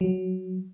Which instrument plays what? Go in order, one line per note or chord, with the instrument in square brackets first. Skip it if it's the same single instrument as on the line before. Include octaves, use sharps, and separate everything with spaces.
[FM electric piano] F#3